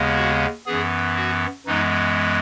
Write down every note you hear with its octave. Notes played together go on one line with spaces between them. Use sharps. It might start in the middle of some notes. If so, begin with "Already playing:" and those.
Already playing: D#2 C#3 G#3 B3
F#4
F#2 E3 B3 G#4
F#4
F#2 E3 G#3 B3 D#4